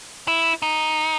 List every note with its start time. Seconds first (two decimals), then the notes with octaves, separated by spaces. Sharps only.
0.28 E4
0.62 D#4